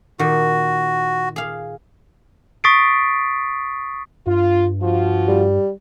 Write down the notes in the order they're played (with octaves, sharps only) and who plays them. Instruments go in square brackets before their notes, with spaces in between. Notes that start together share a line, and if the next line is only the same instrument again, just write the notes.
[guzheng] A#2 D#3 [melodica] F#4
[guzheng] G#4 F5
[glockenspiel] C#6 D#6 A6 B6 C7 D7
[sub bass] G2 [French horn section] F4
[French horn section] F3 F4 F#4
[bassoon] G3